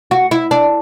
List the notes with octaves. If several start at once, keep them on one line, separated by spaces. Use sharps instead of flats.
F#4
E4
D4